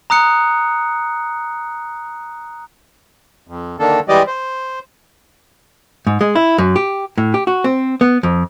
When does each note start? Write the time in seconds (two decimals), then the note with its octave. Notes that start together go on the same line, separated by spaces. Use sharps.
0.10 A#5 D#6 F#6 C#7
3.48 F2
3.79 D3 D#3 A#3 D4 A4
4.08 E3 G3 G#3 G4 D5 D#5
4.27 C5
6.07 G#2
6.21 G#3
6.35 E4
6.58 F#2
6.76 G4
7.18 A2
7.34 G4
7.47 F#4
7.64 C4
8.01 B3
8.23 F2